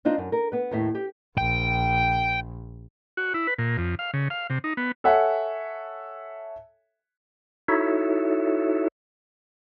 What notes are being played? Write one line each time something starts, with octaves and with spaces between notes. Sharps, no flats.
C4 D4 D#4 F4
F#2
A#4
B3 B4
D#2 A2 E5
G4
A#1 G5
F#4
E4
B4
A#2
F2
F5
C#3
F5
C3
D#4
B3
A4 C#5 E5 F#5 G#5
D#4 E4 F#4 A4 C#5 E5